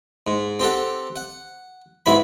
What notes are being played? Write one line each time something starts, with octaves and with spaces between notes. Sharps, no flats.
G#2
C4 G4 A4 F#5
F#5
B1 G#2 E4 B5